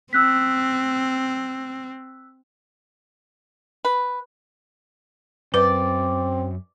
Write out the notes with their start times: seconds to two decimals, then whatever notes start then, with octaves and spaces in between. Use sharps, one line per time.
0.13 C4 E6 F#6 B6
3.85 B4
5.54 F#2 C4 B4 D5